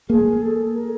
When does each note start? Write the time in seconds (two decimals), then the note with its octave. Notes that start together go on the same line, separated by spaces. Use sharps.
0.09 A#3 G#4
0.42 A4
0.74 A#4